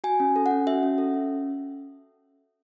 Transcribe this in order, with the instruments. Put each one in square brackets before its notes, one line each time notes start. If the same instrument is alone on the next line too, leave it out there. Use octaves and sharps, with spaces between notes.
[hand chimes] F#4 G#5
C#4
A4
F#5
C#4
F#4 E5
C#4
A4
C#4